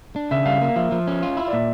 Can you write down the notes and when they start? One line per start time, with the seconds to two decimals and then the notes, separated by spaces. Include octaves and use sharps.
0.16 D4
0.31 C#3 E5
0.45 G3 F5
0.61 A#3
0.76 F3 E5
0.92 F3
1.07 C#4
1.23 F4
1.37 E4
1.47 D5
1.53 A#2 E5